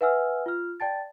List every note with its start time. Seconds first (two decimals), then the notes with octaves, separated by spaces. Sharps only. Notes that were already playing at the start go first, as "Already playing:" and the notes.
0.01 B4 E5 F#5 G#5 E6 F6
0.46 F4 F6
0.80 D5 G5 A5 A6